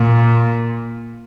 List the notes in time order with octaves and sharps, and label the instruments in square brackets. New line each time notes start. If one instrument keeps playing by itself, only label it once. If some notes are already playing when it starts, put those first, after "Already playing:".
Already playing: [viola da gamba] A#2